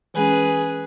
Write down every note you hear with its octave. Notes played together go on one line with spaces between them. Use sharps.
E3 G#3 C#4 G#4 B4